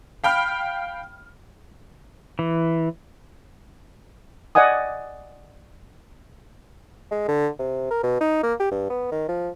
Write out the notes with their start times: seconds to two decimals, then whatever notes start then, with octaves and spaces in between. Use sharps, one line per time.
0.24 F5 G5 B5 F6
2.39 E3
4.55 D5 D#5 F#5 G#5 D#6
7.11 G#3
7.28 D3
7.59 C3
7.91 A#4
8.03 B2
8.21 D#4
8.43 A#3
8.60 G4
8.71 G2
8.90 B3
9.12 D#3
9.29 F3